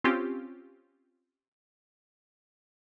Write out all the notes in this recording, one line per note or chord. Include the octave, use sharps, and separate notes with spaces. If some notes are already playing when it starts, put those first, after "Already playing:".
C4 C#4 F4 G4